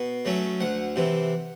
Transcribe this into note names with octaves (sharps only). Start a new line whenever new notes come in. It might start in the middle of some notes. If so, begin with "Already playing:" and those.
Already playing: B2
F#3 A3 C#4
D2 F#5
C3 E3